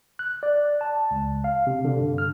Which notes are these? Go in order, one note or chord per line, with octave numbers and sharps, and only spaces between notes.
F#6
D5
A5
C#2
F5
C3
D3
G2
F6